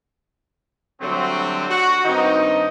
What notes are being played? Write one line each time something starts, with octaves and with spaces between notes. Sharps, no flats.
D3 F#3 G3 A3 C4
F#4
G2 D#3 C4 D#4